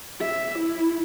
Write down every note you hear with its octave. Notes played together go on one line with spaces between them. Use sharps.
E5
E4